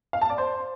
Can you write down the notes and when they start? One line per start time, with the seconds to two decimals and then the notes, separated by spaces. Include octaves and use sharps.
0.13 F5
0.21 A5
0.30 D5
0.38 C5